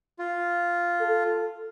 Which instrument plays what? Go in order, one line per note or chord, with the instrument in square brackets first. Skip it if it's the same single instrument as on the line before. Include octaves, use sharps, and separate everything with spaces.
[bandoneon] F4
[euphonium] A4